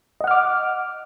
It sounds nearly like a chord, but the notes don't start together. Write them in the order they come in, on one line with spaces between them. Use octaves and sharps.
D#5 F#5 F6 D6